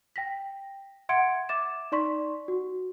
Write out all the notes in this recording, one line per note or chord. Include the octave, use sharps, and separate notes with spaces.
G5 A#6 B6
E5 F#5 C6 G#6 C#7 D7
E5 D6 A6 E7
D#4 D5 C6 C#6 B6
F#4